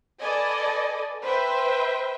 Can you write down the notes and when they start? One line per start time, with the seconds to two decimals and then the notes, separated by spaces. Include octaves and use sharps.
0.19 A4 B4 D5 D#5 G#5
1.23 B4 C5 E5 G5